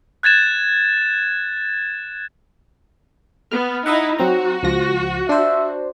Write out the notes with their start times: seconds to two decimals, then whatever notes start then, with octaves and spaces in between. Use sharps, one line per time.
0.23 F#6 G#6 A6 E7
3.52 B3 F6
3.86 D#4 E4 D#5 E5 F#5
4.18 F#3 C4 F#4 A#5
4.63 C#2 F3 A#6
5.29 D4 C5 E5